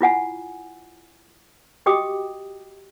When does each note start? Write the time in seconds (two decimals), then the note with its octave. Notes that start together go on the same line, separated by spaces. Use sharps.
0.01 E4 F4 F#5 G#5
1.86 F#4 G4 D#5 G5 D6 D#6